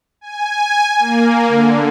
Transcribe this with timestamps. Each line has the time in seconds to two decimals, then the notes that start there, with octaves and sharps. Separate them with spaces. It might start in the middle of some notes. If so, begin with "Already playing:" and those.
0.21 G#5
0.99 A#3
1.48 D3